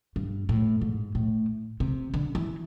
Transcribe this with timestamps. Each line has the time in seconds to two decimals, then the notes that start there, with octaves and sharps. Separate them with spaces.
0.16 G2
0.49 A2
0.81 G#2
1.15 A2
1.80 C3
2.14 D3
2.35 E3